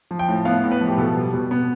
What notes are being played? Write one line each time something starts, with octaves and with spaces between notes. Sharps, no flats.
F3
G5
A2
B3 F5
A2
B4
F3
G4
B2 A4
G3
B2
B3